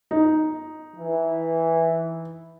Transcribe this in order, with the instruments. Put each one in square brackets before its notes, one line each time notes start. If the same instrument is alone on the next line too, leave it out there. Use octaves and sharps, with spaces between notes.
[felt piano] D#4
[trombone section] E3